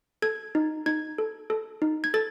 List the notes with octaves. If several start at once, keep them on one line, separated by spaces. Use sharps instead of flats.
A4 G#6
D#4
D#4 G#6
A4
A4
D#4
G#6
A4 A6